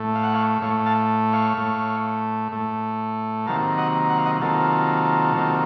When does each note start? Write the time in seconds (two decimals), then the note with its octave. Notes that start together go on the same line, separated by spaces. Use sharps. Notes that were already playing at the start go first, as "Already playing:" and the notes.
Already playing: A2 A3
0.15 F5
0.24 F#5
0.34 C#5 F5
0.62 A2 A3 C#5 F5
0.86 F5 A5
1.33 C#5 F5
1.57 A2 A3
2.52 A2 A3
3.46 C3 D#3 F#3 A#3 F5 A5
3.78 D#5 F#5
4.10 F#5
4.18 F5
4.26 D#5 F#5
4.41 C3 D#3 F#3 A#3 F4 A4
5.36 C3 D#3 F#3 A#3